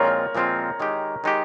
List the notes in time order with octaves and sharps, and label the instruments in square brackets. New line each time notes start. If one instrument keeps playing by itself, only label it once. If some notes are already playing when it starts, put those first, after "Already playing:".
Already playing: [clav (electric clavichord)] A#2 F3 G#3 C4 F4 [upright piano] A#4 C#5
[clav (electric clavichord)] A#2 F3 G#3 C4 F4
D#3 G#3 D#4 G4
D#3 G#3 D#4 G4